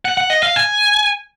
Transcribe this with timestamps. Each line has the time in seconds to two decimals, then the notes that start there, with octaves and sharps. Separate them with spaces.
0.05 F#5
0.17 F#5
0.30 D#5
0.43 F5
0.56 G#5